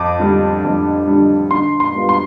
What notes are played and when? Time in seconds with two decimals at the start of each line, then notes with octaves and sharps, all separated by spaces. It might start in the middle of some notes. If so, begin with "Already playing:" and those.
Already playing: F2 D6
0.20 D3 G3 D4
0.64 F2
1.08 D3 G3 D4
1.51 D3 C6
1.80 C6
1.95 G3 B3 F4
2.09 C6